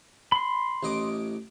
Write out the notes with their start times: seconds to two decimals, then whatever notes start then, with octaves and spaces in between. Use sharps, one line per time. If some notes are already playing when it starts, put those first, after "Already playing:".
0.32 B5 C6
0.83 A1 D#5 D6